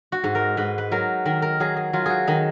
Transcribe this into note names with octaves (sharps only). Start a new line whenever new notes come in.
F#4
G#2
A#4
G#2 B4
B4
F#3 A#4
D#3 A#4
A#4
F#3 G#4
G#4
F#3 F4
F#4 G#4
D#3 D#4